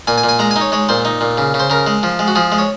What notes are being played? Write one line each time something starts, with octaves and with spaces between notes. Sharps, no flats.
A#2 G#5
G#5
A#2
G#5
G#3 A#5
G#5
D#4
C#5
G#3 C#5
A#2 C5
D#4
A#2
C#3
C#3
C5
C#3 A#4
G#3
F3
G#3
F#4
F3 G#4
G#3
C#5